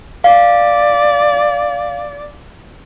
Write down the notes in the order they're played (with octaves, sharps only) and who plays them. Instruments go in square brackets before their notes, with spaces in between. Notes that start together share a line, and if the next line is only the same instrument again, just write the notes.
[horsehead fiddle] D5 [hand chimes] F5